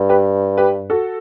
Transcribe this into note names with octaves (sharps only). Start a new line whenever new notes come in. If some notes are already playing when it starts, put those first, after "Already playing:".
Already playing: G2
G4 B4
G4 B4
F#4 A4